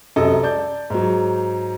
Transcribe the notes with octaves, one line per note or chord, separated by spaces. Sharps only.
C2 F#2 A4 D#5
D5 A5 G6
G#2 F#3